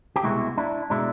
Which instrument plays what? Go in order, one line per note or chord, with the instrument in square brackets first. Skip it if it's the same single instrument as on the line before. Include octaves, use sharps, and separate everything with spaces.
[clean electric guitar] G4
C2 B2 G#3 E4 F#4
D4 E4
B2 G#3 D4 E4